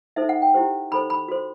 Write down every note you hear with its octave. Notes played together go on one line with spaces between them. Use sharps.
D#4 A4 C5 E5
F#5
G5
E4 G4 C5
D#4 A4 C5 B5
B5
F#4 A4 C5